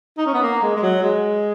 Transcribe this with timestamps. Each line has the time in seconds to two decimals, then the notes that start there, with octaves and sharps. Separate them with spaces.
0.18 D#4
0.26 C#4
0.34 B3
0.42 A#3
0.62 G#3
0.76 G#3
0.82 F#3
1.03 G#3